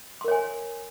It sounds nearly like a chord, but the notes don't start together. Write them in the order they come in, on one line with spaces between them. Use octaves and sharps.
C6 A#4 C#5 G#5